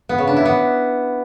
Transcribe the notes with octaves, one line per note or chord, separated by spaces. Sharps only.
B3
C#3
D4
E4
B3